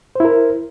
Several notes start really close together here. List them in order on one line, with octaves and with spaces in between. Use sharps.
C5 E4 A#4